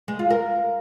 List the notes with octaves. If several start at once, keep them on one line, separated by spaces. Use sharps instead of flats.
G#3
F4
A#4